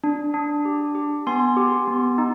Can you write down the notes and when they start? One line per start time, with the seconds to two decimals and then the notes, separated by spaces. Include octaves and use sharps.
0.04 D4
0.34 D4
0.65 G4
0.95 G4
1.27 B3 G#5 C6
1.57 G4
1.88 B3
2.18 D#4